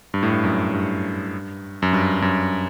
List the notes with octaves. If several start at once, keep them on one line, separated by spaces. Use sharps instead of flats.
G2
A2
G2
F#2
G2
F#2
G2
F#2